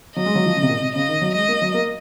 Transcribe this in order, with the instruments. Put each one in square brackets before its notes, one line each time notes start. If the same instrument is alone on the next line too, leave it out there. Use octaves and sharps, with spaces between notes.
[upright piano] F#3 [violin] D#5
[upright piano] G#3
F#3
F3
C#3
C3
A#2
C3
[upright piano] C#3 [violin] D#5
[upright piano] D#3
F#3
[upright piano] G#3 [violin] D#5
[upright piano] A#3
F#3
A#3